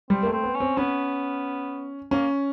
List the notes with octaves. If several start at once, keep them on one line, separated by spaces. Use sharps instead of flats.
G3 C4
A#3
A3
C4
B3
C#4
C4
B3 C#4
A#3 C#4